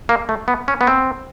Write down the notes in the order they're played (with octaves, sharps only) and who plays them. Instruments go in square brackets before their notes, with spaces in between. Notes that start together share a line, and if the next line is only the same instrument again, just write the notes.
[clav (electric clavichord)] A#3
A3
B3
C#4
B3
C4